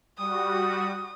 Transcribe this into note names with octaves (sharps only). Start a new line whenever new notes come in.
G3 F#4 D#6